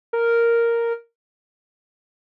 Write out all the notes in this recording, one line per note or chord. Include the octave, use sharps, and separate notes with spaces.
A#4